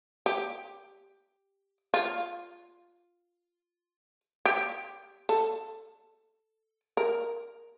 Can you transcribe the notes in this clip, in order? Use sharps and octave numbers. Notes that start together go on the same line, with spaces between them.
G4
F4
G4
A4
A#4